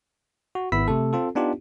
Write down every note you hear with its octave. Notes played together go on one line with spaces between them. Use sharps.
F#4
G#1 B3 E4 B5 E6 B6
C3 A3 A4
C4 F4 A4
B3 D4 D#4 F4 G4